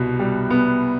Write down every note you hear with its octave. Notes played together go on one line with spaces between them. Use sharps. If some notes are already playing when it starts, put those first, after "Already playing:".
Already playing: C2 B2
G3
B3